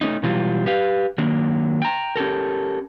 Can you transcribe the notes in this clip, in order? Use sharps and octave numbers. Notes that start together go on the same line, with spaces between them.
A3 C#4 D#4
B2 E3 F#3 G3 F4
G4 B4 F5
D#3 F#3 A#3 D4
G5 A#5
C#4 G4 A4 A#4